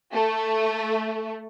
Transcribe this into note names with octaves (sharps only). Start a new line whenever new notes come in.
A3